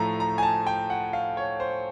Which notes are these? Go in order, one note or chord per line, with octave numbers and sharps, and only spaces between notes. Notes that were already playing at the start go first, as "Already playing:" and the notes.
Already playing: A2 F3 A3 A#5
A#5
G#5
A5
G5
F#5
F5
C#5
C5